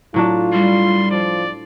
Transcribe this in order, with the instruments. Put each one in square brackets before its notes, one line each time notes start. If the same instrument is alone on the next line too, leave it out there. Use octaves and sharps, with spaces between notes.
[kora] A2 F#3 D4 [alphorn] F4
[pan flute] G3 [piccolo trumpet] C6
[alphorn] F3 [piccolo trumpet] D5